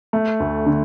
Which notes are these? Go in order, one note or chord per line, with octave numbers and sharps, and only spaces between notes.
A3
D2
D3